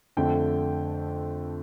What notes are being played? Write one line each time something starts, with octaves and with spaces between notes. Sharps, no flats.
F2 D3 A3 G5